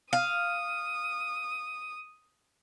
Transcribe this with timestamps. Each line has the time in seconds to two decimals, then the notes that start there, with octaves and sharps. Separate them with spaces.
0.13 F5 D#6